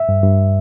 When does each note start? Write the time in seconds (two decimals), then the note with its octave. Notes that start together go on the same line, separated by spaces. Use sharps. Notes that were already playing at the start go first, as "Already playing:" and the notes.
Already playing: E5
0.09 G2
0.23 G2